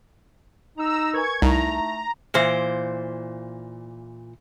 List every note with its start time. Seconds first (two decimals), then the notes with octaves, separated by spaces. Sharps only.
0.77 D#4 A#5 E6
1.14 A#4 B4 G#5 C#6 G#6
1.42 C2 A3 D#4 E4 A#5
2.34 A#2 E3 C5